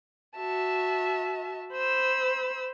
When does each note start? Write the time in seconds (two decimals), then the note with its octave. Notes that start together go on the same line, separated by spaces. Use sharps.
0.36 F#4 E5 A5
1.72 C5 B5 E6